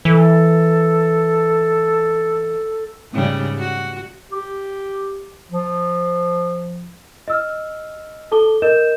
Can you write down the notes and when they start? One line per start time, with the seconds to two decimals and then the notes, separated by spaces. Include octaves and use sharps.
0.05 E3 A4
3.12 G#2 C#3 G3
3.59 F#4
4.32 G4
5.51 F3
7.28 D#5 E6 F6
8.32 A4 A5 D6 G7
8.62 A#4 D#5 G6 E7